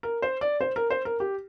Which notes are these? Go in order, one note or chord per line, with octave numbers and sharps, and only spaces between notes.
A#4
C5
D5
C5
A#4
C5
A#4
G4